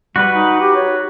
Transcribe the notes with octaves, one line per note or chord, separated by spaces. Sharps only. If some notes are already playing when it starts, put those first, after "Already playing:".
G3 F#4 B4
D#4
G4
C#5